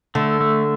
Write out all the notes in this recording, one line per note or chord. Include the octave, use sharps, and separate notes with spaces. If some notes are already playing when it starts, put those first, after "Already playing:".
D3 A3
A3